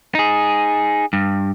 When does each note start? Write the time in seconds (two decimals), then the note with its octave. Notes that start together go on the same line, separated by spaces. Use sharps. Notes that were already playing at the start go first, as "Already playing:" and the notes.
0.15 D#4 G#4
1.13 G2